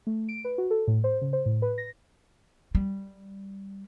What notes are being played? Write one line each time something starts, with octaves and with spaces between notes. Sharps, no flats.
A3
D7
B4
F#4
A4
A2
C5
C#3
C5
A2
B4
A#6
G3